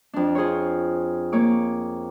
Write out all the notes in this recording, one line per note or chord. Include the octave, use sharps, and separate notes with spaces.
F2 D4
F4 G#4 C5 C#5
A#3 C#5 D6